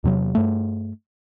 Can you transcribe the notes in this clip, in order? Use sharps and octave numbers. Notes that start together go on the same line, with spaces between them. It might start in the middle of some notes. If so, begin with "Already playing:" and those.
E2 C3 F#3
G2 A3